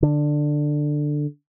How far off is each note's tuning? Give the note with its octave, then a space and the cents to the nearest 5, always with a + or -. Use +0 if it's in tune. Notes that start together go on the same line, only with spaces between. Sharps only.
D3 +10